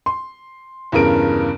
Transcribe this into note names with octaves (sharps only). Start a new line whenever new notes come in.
C6
E2 G2 C#3 A#4 D7